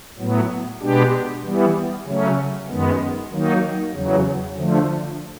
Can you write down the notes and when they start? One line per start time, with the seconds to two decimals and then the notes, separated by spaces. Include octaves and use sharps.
0.18 A2 F#3 B3
0.81 B2 G#3 B3 D4 G4
1.44 E3 G3 B3
2.06 C#3 F#3 A3 C#4
2.69 F#2 D#3 G#3 B3
3.31 D#3 F#3 A#3 D#4
3.94 E2 C#3 F#3
4.57 D3 F3 A3